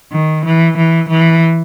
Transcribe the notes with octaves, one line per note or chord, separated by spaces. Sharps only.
D#3
E3
E3
E3